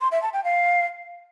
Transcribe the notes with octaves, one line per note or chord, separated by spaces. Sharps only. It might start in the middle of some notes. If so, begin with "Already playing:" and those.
C6
E5
A5
G5
F5